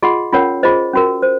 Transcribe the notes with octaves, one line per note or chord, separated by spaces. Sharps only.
F4 G#4 D#5 F#5 C6
C#4 F4 A#4 C#5 F#5
F4 G#4 C5 D#5
C#4 F#4 A#4
C5